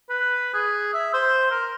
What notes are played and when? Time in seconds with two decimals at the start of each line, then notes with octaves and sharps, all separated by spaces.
0.10 B4
0.54 G#4
0.94 E5
1.13 C5
1.51 A#4